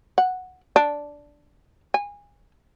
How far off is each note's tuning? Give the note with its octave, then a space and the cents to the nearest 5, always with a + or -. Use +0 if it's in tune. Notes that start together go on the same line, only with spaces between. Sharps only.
F#5 -5
D4 -5
G#5 -25